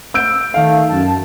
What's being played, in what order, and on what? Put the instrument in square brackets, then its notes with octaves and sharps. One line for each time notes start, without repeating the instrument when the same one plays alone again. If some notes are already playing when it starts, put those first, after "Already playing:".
[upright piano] E6 G6 D7
[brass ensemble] D#3 A3 [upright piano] F5
[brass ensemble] F#2 A5